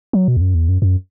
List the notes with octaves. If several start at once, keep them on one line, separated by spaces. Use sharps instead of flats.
F#3
B2
E2
F#2
E2
F#2
F#2